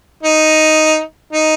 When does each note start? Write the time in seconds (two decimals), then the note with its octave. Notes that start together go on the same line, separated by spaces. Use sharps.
0.23 D#4
1.33 D#4